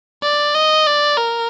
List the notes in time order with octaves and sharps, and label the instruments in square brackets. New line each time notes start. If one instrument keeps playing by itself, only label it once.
[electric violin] D5
D#5
D5
A#4